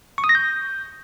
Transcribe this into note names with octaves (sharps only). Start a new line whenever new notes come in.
C#6
D#6
A#6
G6